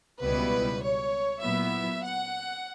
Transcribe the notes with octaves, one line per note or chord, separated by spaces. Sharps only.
C#2 B2 G3 B3 E4 B4
C#5
A#2 F#3 B3 E4 E5
F#5